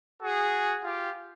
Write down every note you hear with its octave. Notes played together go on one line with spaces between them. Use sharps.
F#4 G#4
F4 G4